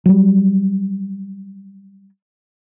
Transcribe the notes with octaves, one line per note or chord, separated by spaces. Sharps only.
F#3 G3